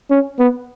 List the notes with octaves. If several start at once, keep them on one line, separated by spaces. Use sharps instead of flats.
C#4
B3